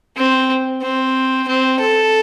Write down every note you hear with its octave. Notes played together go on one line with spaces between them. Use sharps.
C4
C4
C4
A4